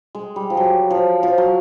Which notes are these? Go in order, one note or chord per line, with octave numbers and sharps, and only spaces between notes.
G#3
G3
F3
F#3
F3
F3
F#3